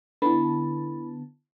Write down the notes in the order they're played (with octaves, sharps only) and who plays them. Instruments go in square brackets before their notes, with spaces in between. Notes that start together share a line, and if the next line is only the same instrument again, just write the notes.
[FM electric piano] D3 B3 A5 [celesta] E4 B5